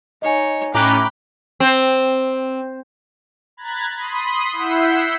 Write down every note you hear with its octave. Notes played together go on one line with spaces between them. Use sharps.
D#4 C#5 D#5 G#5
A2 C#4 G5 A#5 B5 D6 F#6
C4
A#5 B5 F#6 G#6 A6
B5 C6 D#6
E4 F#5 E6 G6 B6 C7